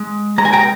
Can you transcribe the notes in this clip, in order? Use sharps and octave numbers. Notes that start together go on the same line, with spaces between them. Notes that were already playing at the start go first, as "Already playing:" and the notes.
Already playing: G#3
G#3 A#5
G#5
G5 A#5